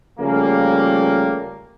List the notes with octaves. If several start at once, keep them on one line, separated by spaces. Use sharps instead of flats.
C#3 F3 G3 A3 A#3